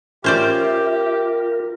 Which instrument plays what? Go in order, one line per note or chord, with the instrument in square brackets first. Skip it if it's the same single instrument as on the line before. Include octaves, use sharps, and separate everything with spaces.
[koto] C#4 C5 D5 [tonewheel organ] F4 A#4 [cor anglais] G4 [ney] E5